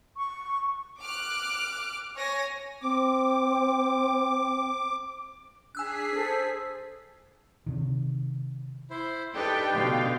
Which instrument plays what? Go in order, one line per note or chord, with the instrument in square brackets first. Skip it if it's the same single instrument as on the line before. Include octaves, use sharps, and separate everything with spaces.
[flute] C#6
[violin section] D6 F6 F#6
C#5 G#5 A#6
[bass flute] C4 [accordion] D6
[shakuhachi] D4 [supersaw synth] G#4 B6 C7 [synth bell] G#5 E6 F#6
[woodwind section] A4 [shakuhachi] C5
[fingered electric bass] C3 D#3
[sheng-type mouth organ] E4 C5
[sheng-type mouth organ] D4 D#4 [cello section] G4 A4 B4 [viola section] G5
[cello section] B2 D3 F5